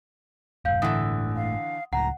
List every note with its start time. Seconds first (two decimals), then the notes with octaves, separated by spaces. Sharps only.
0.65 E1 G2 F5 G6
0.82 G1 A2 D3 E3 A3 F#5 D#6
1.36 F5
1.93 C#2 A2 F#5 A#5